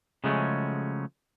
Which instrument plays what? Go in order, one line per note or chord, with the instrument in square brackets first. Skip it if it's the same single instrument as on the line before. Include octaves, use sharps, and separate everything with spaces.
[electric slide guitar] C#3 F3 F#3 G#3 A3 C#4